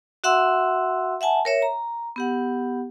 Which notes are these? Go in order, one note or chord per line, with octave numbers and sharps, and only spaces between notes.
F#4 E5 F#5 C6 E6
E5 F#5 G#5 A5
A#4 C#5 E5
A#5
B3 G4 F#5